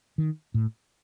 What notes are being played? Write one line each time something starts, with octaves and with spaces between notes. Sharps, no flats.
D#3
A2